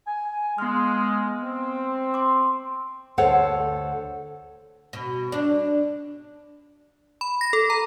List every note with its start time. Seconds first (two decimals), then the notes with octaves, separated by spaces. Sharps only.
0.07 G#5
0.58 G#3 B3 F6
1.44 C4
2.14 C6 D6
3.18 D2 A4 C5 C#5 F#5
4.93 B2
5.32 D4
7.21 B5
7.41 A#6
7.53 A4
7.70 A#5